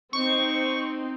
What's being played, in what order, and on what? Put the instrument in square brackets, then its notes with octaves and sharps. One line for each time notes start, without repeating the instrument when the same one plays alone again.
[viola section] C4 D#4 [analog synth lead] C#6